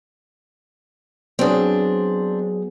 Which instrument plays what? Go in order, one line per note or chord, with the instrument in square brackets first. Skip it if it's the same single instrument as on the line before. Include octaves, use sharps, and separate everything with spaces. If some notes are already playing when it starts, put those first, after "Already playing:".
[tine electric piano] F#3 B3 G#4 [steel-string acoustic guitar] C4 D4